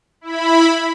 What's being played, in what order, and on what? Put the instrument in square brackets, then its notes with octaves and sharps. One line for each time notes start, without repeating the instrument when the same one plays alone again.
[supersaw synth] E4 B5